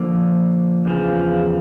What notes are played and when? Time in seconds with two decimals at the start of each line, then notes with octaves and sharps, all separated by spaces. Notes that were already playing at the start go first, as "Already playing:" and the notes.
Already playing: D3 F3 A#3
0.85 E2 C#3 F3